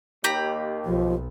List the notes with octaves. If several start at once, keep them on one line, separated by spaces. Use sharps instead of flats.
D#2 G4 A#5 B5
B1 F3